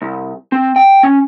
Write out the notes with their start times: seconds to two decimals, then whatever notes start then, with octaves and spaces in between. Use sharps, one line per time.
0.02 C2
0.52 C4
0.76 G5
1.03 C#4